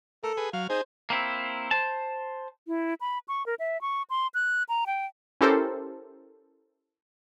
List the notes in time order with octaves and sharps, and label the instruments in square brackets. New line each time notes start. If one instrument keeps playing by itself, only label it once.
[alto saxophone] A4 [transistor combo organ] A#4
[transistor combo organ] G#4 B4
[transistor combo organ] F#3 F6 [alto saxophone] F5
[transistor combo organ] D#4 G#4 [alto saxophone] C5
[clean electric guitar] A#3 C4 E4
C5 A5
[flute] E4
B5
C#6
A#4
E5
C#6
C6
F#6
A#5
G5
[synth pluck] C#4 E4 G4 A4 A#4 C5